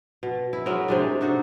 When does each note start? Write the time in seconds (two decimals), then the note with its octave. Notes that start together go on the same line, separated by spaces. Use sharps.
0.23 B2
0.53 E4
0.66 F#3 G#3 A#4
0.88 C3 G#3 D4
1.21 D4 D#4 F#4 A4